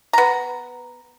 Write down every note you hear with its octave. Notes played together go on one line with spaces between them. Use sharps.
B3 A#5